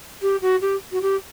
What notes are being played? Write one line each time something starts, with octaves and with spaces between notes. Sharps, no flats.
G4
F#4
G4
F#4
G4